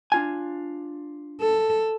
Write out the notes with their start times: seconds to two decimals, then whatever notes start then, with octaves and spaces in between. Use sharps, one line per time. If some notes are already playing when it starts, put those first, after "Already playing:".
0.12 D4 F4 G#5
1.41 A4